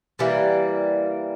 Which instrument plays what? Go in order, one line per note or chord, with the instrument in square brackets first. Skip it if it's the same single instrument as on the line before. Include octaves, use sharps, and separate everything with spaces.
[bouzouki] E3 G3 A#3